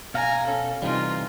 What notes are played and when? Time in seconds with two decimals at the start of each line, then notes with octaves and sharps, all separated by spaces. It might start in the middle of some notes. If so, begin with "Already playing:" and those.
0.14 B2 F5 G#5 A#5
0.46 C#4 A4
0.82 C3 E3 G3 D#4 F4